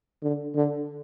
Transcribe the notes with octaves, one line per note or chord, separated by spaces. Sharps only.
D3
D3